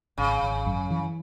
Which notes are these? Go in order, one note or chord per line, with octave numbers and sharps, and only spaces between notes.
G#1 C#3
G#1
F#2
E3